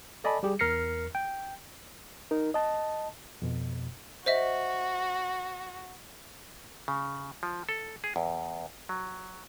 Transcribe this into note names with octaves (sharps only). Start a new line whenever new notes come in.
A4 D5 D#5 G#5 A5 B5
G3 G4 G#4
E2 A#4 F6 A#6 C7 C#7
G5
D#4 A#4
D#5 A5
F2 B2
F#4 C5 D#5 E5
C#3
F3
A4
G#4
E2
F#3